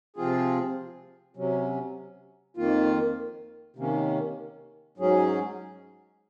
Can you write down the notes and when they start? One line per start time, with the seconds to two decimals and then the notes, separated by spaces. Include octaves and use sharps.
0.16 C3 F3 C4 F4 G#4
1.37 C3 F#3 C#4
2.57 F2 D#3 A#3 F4
3.76 C3 D#3 A#3 C#4
4.98 G#2 F#3 C#4 G#4